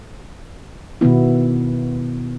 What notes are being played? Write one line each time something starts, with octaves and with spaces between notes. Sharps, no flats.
B2 D#3 B3 E4